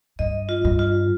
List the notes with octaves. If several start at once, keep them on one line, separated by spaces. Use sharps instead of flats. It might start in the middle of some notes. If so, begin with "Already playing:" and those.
G2 D#5
F4
G2
F4